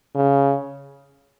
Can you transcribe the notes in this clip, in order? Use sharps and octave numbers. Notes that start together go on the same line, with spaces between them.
C#3